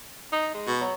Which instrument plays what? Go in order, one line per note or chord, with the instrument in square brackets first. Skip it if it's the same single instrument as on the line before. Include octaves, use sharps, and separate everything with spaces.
[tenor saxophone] D#4
G#3
[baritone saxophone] B2
[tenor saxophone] F#3